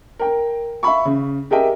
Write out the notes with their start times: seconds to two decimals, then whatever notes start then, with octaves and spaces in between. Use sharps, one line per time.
0.19 A#4 G5
0.83 E5 F5 B5 C#6
1.05 C#3
1.51 G4 G#4 A#4 D#5 E5 G5